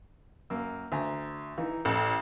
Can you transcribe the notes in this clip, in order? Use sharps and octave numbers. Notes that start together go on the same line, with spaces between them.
F#2 A#3 E6
D2 G#5 A#5
E3 D#4
A1 A4